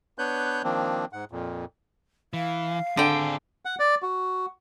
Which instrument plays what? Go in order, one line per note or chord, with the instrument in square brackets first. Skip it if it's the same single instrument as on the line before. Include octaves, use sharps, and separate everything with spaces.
[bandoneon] B3 D4 B4 C#5 F#6 G6
D#3 F3 A#3 C4 D4
G#2 F#5
F2 A#2
[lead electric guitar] E3 [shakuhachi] F5
[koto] D3 G5 [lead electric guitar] C4 G#4
[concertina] F#5
D5
F#4